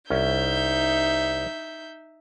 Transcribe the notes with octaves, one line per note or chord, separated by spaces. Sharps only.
C2 C#4 D#4 E5 G6